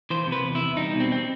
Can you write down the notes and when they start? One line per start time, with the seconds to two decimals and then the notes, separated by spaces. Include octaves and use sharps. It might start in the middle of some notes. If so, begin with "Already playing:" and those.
0.10 E3 C5
0.27 C3
0.32 B4
0.44 E2
0.55 E4
0.61 E2
0.77 G3 D#4
0.94 B2
1.00 C4
1.12 C4